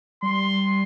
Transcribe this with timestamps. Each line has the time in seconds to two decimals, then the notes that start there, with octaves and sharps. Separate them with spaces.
0.22 G3 C6